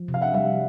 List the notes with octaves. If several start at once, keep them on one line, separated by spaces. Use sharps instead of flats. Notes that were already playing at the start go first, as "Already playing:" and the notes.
Already playing: F3
C3
F5
E5 F#5
G3 E5 F#5